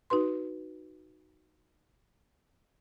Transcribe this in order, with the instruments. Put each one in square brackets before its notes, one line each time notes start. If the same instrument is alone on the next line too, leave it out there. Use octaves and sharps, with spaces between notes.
[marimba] D#4 F#4 B4 C6